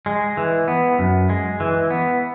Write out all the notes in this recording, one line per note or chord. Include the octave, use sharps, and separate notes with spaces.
G#3
E3
B3
F#2
G#3
E3
B3